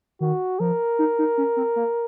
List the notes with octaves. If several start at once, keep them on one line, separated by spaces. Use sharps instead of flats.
D#3 F#4
F3 A#4
D#4
D#4
C#4
C4
A#3